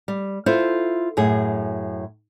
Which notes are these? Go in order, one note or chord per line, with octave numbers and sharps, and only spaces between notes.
G3
E4 F4 A4 C5
F#2 A2 G#4